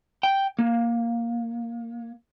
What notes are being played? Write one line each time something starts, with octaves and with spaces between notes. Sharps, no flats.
G5
A#3